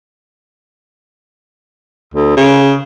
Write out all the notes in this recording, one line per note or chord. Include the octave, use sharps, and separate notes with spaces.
D2
C#3